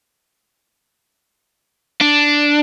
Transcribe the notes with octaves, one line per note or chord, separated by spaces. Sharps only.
D4